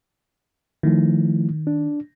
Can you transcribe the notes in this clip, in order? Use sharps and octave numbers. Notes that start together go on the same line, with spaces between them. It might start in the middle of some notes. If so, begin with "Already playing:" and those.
D#3 F3 A3 E4
D4